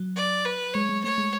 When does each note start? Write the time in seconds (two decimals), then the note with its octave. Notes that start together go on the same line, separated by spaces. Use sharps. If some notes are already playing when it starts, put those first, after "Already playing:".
Already playing: F#3
0.16 D5
0.45 B4
0.74 G#3 C#5
0.89 G#3
1.04 A3 C#5
1.18 G#3